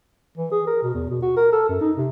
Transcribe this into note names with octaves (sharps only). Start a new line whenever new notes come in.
E3
G#4
A#4
B2
E2
B2
F#4
A#4
A4
F#2
D#4
C3